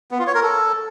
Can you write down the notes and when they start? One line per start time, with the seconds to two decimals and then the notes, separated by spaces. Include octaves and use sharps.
0.11 B3
0.19 F4
0.27 C#5
0.35 A#4
0.43 A4